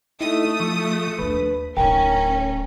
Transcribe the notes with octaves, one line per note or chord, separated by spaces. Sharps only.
A3 D#4 E4 D#6
F3 C#6
D#2 D4 B4
D1 C#4 D#4 A#4 G5